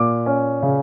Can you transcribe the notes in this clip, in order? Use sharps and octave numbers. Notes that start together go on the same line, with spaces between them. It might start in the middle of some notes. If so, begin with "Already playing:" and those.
Already playing: A#2 D6
C#4
C#3